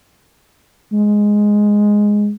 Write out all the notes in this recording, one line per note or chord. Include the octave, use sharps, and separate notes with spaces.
G#3